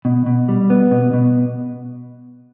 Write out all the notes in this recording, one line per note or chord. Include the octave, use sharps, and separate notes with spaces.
B2
B2
G3
B3
B2
B2